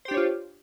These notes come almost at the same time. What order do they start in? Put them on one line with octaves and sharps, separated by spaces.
C5 G4 D4 C#5 F4